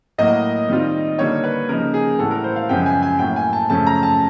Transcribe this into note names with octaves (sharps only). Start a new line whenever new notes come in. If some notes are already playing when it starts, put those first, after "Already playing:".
A2 F#3 A#3 D#5
D#3 G3 C4 F4
D3 G3 A#3 D#4 C#5
B4
C#3 F3 A#3 D#4 A#4
G#4
A2 E3 G3 B3 A4
A#4
C5
F5
F#2 C#3 F3 G#3 B3 G5
G#5
G#5
A2 F#3 A#3 G5
G#5
A5
F#2 C#3 F3 A3 C#4 A5
A#5
A5